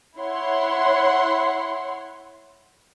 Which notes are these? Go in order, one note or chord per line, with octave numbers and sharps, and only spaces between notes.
E4 C#5 F#5 C6